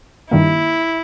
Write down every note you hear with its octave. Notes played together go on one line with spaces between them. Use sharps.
G2 D#3 G3 A#3 E4